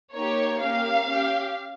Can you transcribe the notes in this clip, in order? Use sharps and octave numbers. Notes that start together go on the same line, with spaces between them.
A#3 D#4 G4 C#5
A#3 C#4 G4 F5
C#4 G4